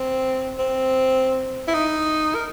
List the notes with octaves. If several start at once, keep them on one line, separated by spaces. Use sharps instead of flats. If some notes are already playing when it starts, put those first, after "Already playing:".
Already playing: C4
C4
E4
D#4
A#4